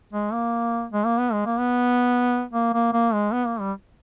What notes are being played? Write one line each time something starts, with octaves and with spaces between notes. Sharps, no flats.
G#3
A#3
G#3
A#3
B3
G#3
A#3
B3
A#3
A#3
A#3
G#3
B3
A#3
G3